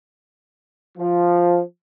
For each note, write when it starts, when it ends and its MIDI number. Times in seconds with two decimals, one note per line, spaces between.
0.98 1.59 53